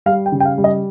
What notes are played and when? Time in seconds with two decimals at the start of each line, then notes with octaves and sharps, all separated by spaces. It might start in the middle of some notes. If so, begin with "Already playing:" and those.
0.06 G3 F5
0.26 G5
0.32 C#3
0.40 G5
0.45 F5
0.58 G3
0.64 D#5